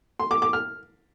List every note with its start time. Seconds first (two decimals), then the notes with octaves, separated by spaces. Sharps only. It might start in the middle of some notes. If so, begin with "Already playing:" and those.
0.20 C6
0.31 D6
0.42 D6
0.53 F6